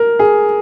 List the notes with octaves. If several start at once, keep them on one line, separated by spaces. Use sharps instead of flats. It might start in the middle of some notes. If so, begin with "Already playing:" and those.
Already playing: A#4
G#4